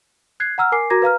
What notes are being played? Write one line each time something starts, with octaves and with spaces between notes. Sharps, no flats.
F#6 G#6 C7
F#5 A#5 E6 F6
A#4 G#5 D6 C7
F#4 A#4 A#5 D6 G#6 A#6
B4 F5 A#5 F6